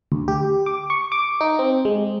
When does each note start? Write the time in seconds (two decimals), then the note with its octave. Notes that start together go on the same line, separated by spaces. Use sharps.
0.12 D2
0.28 G4
0.66 D6
0.90 C#6
1.12 D6
1.41 D#4
1.59 C4
1.85 G#3